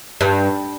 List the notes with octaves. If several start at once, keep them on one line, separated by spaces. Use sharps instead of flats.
G2